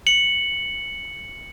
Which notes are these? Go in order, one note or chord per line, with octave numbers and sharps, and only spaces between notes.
C#7 F#7